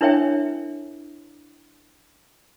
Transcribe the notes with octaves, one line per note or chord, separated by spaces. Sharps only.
D4 E4 A#4 C#5 E5 G5